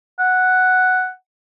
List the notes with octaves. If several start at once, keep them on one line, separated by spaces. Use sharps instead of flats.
F#5